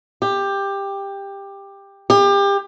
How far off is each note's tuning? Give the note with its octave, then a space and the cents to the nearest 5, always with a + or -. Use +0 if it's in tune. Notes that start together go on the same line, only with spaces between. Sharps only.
G4 +15
G4 +30